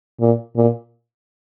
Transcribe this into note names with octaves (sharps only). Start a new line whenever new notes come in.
A#2
A#2